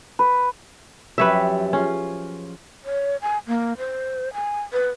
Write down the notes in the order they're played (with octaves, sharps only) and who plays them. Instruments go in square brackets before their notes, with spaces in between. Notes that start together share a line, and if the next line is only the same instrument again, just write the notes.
[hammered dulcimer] B4
[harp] F#2 F3 G4 [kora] B4 C#5 E5
[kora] C#4 [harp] F4 G#4
[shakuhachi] C#5
G#5
A#3
C5
G#5
B4